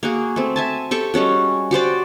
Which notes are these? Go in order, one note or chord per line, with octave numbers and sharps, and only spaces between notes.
A#3 F#4 G#4
A3 C4
E5 G#5 A5
G4 A4 C#6
G3 G#3 C#4 F#4
F#4 G4 C5 D5